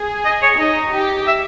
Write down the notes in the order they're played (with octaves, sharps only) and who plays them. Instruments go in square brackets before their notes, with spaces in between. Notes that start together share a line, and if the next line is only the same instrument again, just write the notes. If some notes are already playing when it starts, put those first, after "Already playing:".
Already playing: [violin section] G#4
[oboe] D#5
C#5
[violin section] D#4 [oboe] D#5
[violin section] G4
[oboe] E5